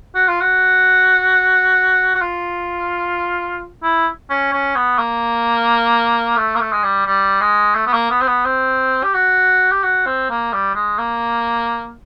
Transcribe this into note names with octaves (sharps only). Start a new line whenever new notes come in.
F#4
F4
F#4
F#4
F4
E4
C#4
C#4
B3
A#3
A3
A#3
A3
G#3
G3
G3
G#3
A3
B3
A#3
B3
C4
B3
C4
G4
F#4
G4
F#4
C4
A#3
G3
G#3
A#3